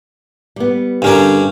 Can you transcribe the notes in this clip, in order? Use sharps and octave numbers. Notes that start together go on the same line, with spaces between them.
G3 B3
G2 D3 C#4 G4 G#4 A#4